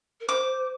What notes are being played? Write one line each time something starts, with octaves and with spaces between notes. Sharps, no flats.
A#4
C5 D6